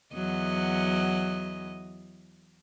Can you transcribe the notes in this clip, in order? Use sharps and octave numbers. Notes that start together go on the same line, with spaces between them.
E2 F#3 D#5